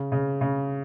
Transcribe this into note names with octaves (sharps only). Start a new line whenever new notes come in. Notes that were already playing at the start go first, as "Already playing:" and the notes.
Already playing: C#3
C#3
C#3